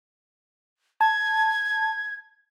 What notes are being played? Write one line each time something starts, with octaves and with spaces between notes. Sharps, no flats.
A5 G#6